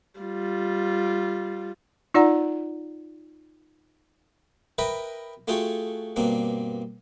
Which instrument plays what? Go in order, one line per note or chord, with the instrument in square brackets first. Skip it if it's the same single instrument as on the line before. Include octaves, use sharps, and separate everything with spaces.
[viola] G3 F4
[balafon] D#4 F4 D5 F#5 A#5
[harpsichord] A#4 B4 D#5 E5 G5 B5
A3 F4 F#4 G#4 A4 G5
G2 B2 A#3 C4 D4